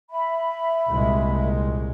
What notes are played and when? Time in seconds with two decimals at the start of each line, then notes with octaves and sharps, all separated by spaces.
0.10 E5 B5
0.88 C2 A#2 G#3